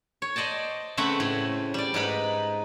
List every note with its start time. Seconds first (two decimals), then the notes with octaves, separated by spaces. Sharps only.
0.22 C#5
0.36 C5 D5 D#5 G5 A5
0.97 C#3 A3 C4 B4 E5 F#5
1.20 A2
1.74 G3 D5
1.94 G#2 D#4 B4 B5